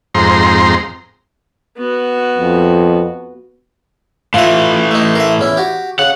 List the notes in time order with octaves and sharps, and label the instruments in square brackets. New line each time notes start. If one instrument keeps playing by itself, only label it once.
[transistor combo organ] F2 G#2 C4 A#5 C6
[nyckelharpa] B3 F#4
[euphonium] F2
[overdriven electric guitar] A2 E3 [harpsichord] F4 E5
[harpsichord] A3 D#4
A#4 E5
E2 C#4 E4
F#4 G4
[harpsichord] C#3 [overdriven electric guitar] F#5